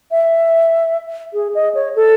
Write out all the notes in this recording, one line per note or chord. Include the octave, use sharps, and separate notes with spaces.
E5
G#4
D#5
C#5
A4